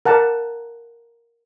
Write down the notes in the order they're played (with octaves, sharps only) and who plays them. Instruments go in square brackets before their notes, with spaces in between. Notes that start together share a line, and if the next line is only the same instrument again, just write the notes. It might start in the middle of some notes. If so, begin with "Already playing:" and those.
[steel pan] A#4 F#5 A5